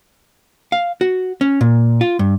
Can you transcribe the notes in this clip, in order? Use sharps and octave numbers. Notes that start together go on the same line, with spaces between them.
F5
F#4
C#4
A#2
F4
G2